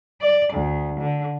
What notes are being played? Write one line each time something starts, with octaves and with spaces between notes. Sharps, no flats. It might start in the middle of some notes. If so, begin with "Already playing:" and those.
D5
D2
D3